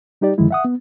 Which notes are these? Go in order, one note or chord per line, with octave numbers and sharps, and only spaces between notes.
G3 D#4 G4 D5
F#2 D3 D#3 F3 G#3 E4
E5 F#5 D#6
B3